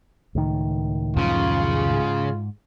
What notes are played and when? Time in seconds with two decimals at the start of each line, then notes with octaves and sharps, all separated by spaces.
0.35 C#2 A2 D#3
1.17 F2 C#3 F#3 G3 F4
1.90 G#2